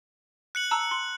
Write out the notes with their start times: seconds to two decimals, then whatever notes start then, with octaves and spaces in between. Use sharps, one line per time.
0.55 F#6 C#7 F#7
0.71 A5 A#5 E6
0.91 C6